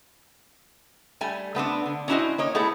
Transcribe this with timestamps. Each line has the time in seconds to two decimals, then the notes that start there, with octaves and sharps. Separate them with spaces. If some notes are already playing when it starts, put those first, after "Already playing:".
1.21 G3 A3 G#5
1.55 A3 B3 C4 D4
1.86 D3
2.08 C#4 D4 E4 F#4 C5 D#5
2.38 A#3 C#5 D#5
2.55 A3 B3 E4 G#4 A4